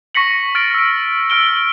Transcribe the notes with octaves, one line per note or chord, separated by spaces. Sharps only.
C#6 A#6 B6 C#7 F#7
F6 A6 D7
E6 D7
E6 F6 D7 G7